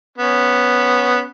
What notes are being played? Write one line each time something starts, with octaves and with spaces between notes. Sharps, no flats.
B3 C#4